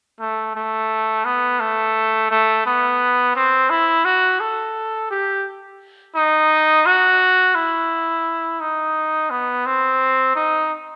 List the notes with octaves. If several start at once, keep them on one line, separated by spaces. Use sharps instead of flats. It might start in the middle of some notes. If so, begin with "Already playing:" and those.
A3
A3
B3
A3
A3
B3
C4
E4
F#4
A4
G4
D#4
F#4
E4
D#4
B3
C4
D#4